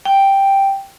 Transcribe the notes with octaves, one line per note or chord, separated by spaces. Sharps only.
G5